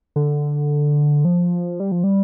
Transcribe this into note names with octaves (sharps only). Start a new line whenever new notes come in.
D3
F3
G3
F3
G3